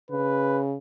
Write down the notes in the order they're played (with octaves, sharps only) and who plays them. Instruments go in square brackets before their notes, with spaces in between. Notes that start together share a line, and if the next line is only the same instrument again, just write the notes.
[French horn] C#3 [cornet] B4